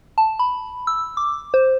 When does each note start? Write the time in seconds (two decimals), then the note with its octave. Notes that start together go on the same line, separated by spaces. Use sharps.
0.18 A5
0.39 B5
0.87 E6
1.17 D6
1.54 C5